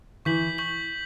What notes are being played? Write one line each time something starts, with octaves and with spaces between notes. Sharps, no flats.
E3 C#6 G6 B6 F#7
C#6 G6 B6 F#7